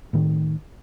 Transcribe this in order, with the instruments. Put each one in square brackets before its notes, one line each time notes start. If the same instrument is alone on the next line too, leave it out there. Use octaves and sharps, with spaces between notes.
[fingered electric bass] A2 D#3 A3